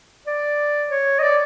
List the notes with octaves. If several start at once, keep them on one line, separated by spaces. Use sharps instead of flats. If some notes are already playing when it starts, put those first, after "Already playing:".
D5
C#5
D#5
D5